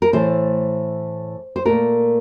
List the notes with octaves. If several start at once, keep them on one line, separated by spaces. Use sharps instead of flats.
A#4
A2 E3 A3 C5
C5
A#2 A3 A#4